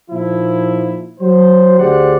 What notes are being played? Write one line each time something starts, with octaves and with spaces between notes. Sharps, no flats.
A#2 F3 D#4 E4
F#3 C5
D2 G4 G#4 C5 D5 F#5